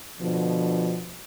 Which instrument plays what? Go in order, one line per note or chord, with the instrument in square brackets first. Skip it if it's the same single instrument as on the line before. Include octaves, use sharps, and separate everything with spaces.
[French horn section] B2 D3 F3